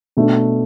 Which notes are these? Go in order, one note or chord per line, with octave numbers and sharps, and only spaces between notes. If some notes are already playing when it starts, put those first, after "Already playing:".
B2 A3 D4